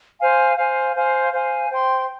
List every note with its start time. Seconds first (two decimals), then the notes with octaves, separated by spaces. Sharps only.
0.20 C5 F5 G#5
0.57 C5 F5 G#5
0.95 C5 F5 G#5
1.32 C5 F5 G#5
1.70 C5 G5 C6